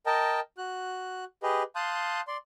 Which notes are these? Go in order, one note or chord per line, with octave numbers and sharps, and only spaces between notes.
A#4 D#5 G5 A5
F#4 F#6
G4 G#4 B4 D#5
F5 A5 C6 D#6 F#6 G6
D5 C6